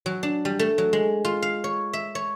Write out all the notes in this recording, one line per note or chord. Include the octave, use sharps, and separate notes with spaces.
F#3
D4
G3
A3
F#3
G#3
F4
F5
C#5
E5
C#5